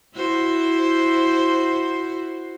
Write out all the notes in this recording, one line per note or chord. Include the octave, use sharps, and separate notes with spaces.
E4 F#4 C5